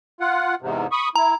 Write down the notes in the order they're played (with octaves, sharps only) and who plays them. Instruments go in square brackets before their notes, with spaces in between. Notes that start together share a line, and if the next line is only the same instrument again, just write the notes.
[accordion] F4 F#5
E2 G#2 C3
B5 C#6 D#6
[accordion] E4 [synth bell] A#5